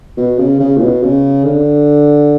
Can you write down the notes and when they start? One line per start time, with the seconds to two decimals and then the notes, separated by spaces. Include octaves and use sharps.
0.17 B2
0.38 C#3
0.60 C#3
0.77 A2
0.81 B2
1.03 C#3
1.45 D3